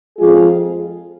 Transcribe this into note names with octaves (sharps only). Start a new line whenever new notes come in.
F2 F3 G#3 F4 G#4